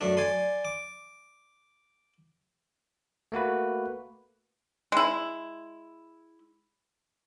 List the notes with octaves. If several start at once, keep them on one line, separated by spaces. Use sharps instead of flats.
F#2 A3 D4
D5 G#5 C6
D6
A3 A#3 F#4 B4
G#3 E4